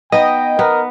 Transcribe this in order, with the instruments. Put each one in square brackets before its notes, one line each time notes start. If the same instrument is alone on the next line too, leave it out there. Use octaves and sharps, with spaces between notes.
[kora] B3 D#4 [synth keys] D#5 [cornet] G5
[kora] B3 [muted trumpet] A#4